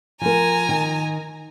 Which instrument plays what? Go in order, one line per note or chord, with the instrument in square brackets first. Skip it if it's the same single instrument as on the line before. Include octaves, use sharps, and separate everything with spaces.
[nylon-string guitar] F3 A#4 [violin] G#5 A#5
[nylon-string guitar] D#3